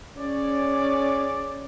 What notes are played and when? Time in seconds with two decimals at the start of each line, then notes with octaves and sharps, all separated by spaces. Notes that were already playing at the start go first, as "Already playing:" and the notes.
0.16 C#4 G#4 C#5 D5